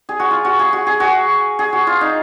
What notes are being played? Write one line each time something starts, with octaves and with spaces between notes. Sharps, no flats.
G#4
F#4
F4
F#4
G#4
F#4
G#4
F#4
G#4
F#4
F4
D#4